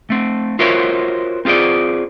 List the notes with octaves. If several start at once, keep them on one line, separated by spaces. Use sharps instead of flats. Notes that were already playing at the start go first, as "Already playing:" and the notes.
A3 C4
F4 F#4 A#4 C5 C#5 E5
C4 F4 G#4 C5 D5